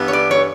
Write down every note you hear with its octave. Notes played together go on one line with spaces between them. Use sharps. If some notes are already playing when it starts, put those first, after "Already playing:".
Already playing: G2 E3 G3 B3
C#5
D5
C#5